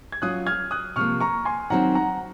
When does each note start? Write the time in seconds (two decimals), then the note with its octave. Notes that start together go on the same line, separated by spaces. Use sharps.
0.12 G#6
0.22 F#3 C#4 F4 D#6 F#6
0.47 F6 G#6
0.71 D#6 F#6
0.96 C3 F3 A#3 C#6 F6
1.20 A#5 C#6
1.45 G#5 C6
1.70 D#3 F#3 C4 F#5 A#5
1.95 F#5 A#5